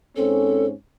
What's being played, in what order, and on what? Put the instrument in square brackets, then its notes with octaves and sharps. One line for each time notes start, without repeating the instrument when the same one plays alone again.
[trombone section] G#2 C4 C#4 [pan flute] A4